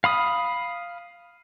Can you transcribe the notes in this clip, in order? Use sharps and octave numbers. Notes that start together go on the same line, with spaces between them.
F5 B5 D#6